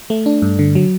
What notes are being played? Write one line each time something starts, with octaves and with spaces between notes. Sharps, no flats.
A3
D4
G2
D3
F#3